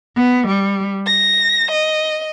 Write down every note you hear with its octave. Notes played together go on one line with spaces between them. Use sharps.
B3
G3
A#6
D#5